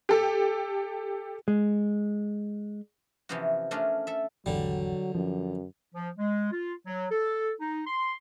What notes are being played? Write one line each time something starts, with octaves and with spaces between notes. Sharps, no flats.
G4 A4
G#3
C3 E3 F3 B3 C#4 F#4
A3 C#4 D4 F4 A#4
A4 E5
G#1 E2 D3 F#3 G3
F#2 F3
F3
G#3
F4
F#3
A4
D#4
C6